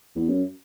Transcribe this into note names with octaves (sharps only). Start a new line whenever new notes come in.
E2
F#2